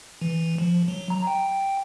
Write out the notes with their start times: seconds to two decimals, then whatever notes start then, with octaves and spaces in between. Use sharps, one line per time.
0.21 E3
0.58 F3
0.88 F#3
1.10 A#5
1.27 G5